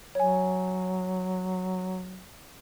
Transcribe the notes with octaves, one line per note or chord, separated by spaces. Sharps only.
F#3 C#5 G#5